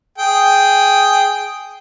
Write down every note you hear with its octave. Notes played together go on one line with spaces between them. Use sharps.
G#4 G5